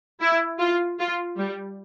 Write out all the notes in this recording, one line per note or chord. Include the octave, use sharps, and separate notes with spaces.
E4
F4
F4
G3